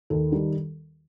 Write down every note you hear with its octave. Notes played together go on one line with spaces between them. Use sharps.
D#2 A4
D#3 G3